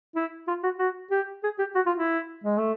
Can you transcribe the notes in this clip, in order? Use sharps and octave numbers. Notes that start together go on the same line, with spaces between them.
E4
F4
F#4
F#4
G4
G#4
G4
F#4
F4
E4
G#3
A3